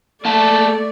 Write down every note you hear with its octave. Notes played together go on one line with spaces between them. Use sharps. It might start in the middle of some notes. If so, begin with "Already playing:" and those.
A3 A#3 D5 E5 A5